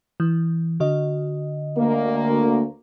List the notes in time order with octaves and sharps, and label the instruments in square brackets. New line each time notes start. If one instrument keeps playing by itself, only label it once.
[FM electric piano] E3
D3 F#4 D#5
[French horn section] D2 A#3